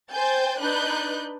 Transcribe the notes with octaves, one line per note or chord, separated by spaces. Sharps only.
C5 G5 G#5 G6 A6
D4 D#4 B4 F#6 G6